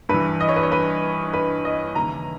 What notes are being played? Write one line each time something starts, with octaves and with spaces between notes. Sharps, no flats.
G2 B4
E3
D#5
C#5
B4
C#5
B4
B4
D#5
D#2 C#3 E3 A#5